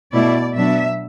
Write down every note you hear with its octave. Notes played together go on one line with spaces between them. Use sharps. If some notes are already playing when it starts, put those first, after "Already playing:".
B2 A3 E4 D5
B2 F#3 B3 D4 E5